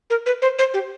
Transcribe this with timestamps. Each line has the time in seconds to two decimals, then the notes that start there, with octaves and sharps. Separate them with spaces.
0.10 A#4
0.26 B4
0.42 C5
0.59 C5
0.74 G4